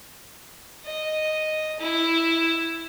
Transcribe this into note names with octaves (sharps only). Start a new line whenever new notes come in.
D#5
E4